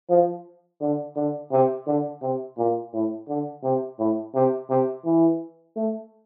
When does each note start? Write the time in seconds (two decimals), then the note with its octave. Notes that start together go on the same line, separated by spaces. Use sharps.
0.10 F3
0.81 D3
1.16 D3
1.52 C3
1.87 D3
2.22 C3
2.58 A#2
2.93 A2
3.29 D3
3.63 C3
3.99 A2
4.35 C3
4.70 C3
5.05 E3
5.76 A3